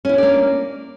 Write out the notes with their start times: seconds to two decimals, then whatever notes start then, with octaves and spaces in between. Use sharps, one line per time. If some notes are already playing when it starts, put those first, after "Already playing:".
0.05 C#4
0.09 E4
0.14 D4
0.18 D5
0.23 A#3